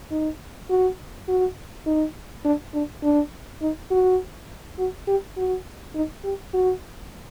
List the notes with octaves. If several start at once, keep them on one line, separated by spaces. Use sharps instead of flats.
D#4
F#4
F#4
D#4
D4
D4
D4
D#4
F#4
F#4
G4
F#4
D#4
G4
F#4